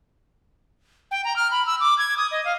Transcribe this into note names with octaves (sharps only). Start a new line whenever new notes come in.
G5
A#5
F6
B5
E6
D6
G#6
D#6
D#5
F5